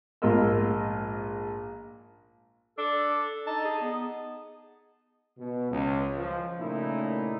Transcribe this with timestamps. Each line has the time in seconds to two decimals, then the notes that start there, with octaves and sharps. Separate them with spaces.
0.22 A#1 G#2 F4 A#4 D#5 E6
2.78 D4 A4
3.47 D#4 A5
3.65 G#4
3.81 B3
5.38 B2
5.71 C#2
6.18 F3
6.59 A#2 C#3 A3 A#3 D#4 E4